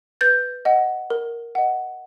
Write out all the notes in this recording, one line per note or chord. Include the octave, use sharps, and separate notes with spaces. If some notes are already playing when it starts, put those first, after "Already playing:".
B4 G6 A6
D#5 F#5
A#4
D#5 F#5